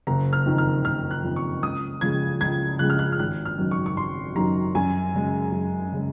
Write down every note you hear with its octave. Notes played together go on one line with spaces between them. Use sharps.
F#1 A#5
F6
F2 D#3
F6
F#1 F6
F#6
F2 D#3
C#6
C#2 D#6
C#3 F3 G#3 G#6
C#2 G#6
C#3 F3 G#3 F#6
F6
F#6
F6
G#1 F#6
F6
F#2 D#3 F#3
C#6
C#6
G#1 C6
F#2 D#3 F#3 A#5
F#2 G#5
C#3 G#3
F#2
C#3 G#3